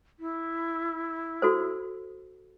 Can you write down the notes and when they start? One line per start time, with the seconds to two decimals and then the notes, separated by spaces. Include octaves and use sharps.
0.20 E4
1.42 F#4 A4 C5